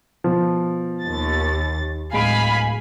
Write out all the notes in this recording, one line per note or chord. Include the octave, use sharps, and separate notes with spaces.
B2 F3
D#2 A6
D1 G#3 F5 G#5 B5 D7